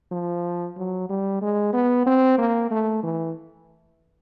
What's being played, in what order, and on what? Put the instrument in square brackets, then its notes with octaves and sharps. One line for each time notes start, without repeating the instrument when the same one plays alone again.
[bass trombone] F3
F#3
G3
G#3
B3
C4
A#3
A3
E3